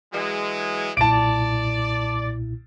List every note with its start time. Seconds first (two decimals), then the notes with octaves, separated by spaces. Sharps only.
0.13 E3 F#3 G#3
0.97 B1 A#2 E4 D5 A5 D7